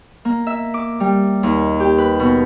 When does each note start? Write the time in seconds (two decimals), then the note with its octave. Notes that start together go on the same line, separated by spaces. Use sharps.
0.25 A#3
0.47 E5
0.74 D6
1.00 G3
1.43 D#2
1.80 G4
1.98 B4
2.20 B2